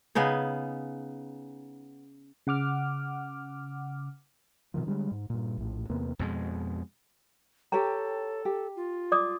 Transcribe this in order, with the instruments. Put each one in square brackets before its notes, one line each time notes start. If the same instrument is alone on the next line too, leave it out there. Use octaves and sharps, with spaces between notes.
[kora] C#3 B3 D#4 G#4
[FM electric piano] C#3 F#5 D6 F6
[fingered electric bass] B2 D3 D#3 F3
D3 G3 G#3
G#2
G2 A#2
A#1 A2
E2 C3 A#3 B3
[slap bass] F2 B2 G#3
[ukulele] G4 C#5 G5 [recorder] A4 [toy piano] A#5
[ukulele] G4
[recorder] F4
[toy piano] D5 D6 D#6